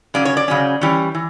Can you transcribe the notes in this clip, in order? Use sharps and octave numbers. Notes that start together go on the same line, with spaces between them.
C#3 F#3 C#4 D5
C#5
D5
C#3 F#3 C#4
E3 G3 C#4
E3